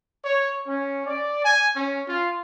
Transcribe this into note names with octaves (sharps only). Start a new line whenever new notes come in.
C#5
C#4
D5
G#5
C#4
F4